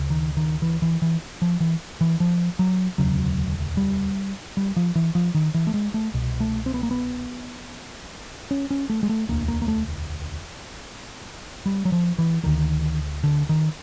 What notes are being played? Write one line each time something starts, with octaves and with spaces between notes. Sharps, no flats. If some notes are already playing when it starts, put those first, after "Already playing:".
Already playing: D2 C#3
D#3
D#3
E3
E3
E3
F3
E3
E3
F3
F#3
E1 D2 C#3 F#3
G3
G3
F3
E3
F3
D#3
E3
A3
G#3
A3
C2 B2
A3
C4
B3
A#3
B3
C#4
C#4
A3
G#3
A3
E1 D2 D3 A#3
A#3
A#3
A3
G3
F#3
F3
E3
D2 D3 D#3
D3
D#3